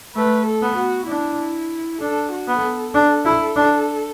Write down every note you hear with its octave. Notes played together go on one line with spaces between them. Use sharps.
A3 B4
A4
B3
F#4
D4 E4
D4 A4
F#4
B3
A4
D4
E4
D4